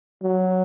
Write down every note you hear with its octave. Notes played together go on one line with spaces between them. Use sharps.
F#3